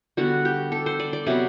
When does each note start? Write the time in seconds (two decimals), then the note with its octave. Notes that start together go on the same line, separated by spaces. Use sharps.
0.17 D3 G3 B3 F#4
0.45 G4
0.72 A4
0.86 C5
1.00 D5
1.13 D5
1.26 C3 F#3 B3 D5